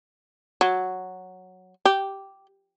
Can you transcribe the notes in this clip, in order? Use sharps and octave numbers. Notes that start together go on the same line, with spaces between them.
F#3
G4